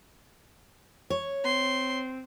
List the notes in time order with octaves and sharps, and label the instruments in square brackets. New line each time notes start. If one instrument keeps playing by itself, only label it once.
[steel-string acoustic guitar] C#5
[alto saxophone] C4 [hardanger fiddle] C6